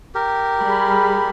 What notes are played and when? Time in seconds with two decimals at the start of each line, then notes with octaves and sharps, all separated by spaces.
0.15 G4 A#4
0.62 G3 G#4 B5